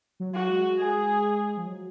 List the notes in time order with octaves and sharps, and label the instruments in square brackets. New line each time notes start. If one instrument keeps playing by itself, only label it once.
[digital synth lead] F#3
[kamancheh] F#4
[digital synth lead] G#3
[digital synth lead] G#3 [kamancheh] G#4
[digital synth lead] F3
F#3